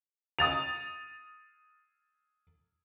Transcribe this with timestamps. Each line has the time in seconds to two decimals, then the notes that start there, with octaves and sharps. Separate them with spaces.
0.39 D#6 A6 F7